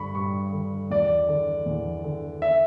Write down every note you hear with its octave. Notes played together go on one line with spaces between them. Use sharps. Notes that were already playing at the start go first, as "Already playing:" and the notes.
Already playing: G2 D3 B5 C#6
G2 C#6
D3
E2 D5
D3
E2
D3
E5